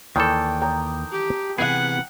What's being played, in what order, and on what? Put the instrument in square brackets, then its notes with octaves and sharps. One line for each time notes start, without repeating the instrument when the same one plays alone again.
[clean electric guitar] D#2 [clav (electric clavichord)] D#3 E3 A4 [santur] D5 G5 A5
[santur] G5 A#5 D#6
[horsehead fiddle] G4
[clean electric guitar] C3 E3 B3 [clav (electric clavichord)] G#4 [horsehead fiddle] F#5